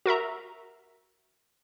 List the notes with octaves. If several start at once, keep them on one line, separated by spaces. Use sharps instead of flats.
F#4 A#4 E5 A#5